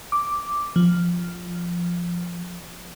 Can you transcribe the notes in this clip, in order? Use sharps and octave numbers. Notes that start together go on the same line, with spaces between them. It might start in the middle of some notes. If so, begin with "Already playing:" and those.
D6
F3